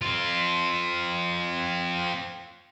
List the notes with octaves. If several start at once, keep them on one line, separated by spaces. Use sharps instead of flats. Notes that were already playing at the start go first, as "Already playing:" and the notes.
C4 F4